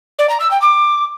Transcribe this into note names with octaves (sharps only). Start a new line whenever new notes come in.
D5
A#5
E6
G5
D6